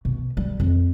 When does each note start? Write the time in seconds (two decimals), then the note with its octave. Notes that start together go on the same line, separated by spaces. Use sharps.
0.05 B2
0.37 G3
0.60 F2